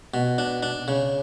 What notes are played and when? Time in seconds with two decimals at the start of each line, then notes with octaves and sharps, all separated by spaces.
0.14 B2
0.38 D4
0.63 D4
0.88 C#3